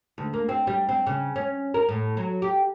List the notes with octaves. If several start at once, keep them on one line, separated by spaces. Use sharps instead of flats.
D2
A#3
C4
G3
C4
C#3
C#4
A#4
A2
F#3
G4